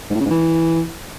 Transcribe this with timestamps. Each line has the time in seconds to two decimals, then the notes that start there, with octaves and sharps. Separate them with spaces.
0.10 G#2
0.15 A2
0.20 C#3
0.25 G#2
0.31 E3